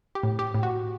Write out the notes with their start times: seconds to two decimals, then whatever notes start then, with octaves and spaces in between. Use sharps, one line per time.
0.15 G4
0.23 A2
0.39 G4
0.54 A2
0.63 F#4